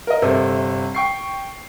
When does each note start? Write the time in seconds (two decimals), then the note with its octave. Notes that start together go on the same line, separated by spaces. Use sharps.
0.07 A#4 D#5
0.22 G1 C3 A4 E5
0.95 G5 C#6 C7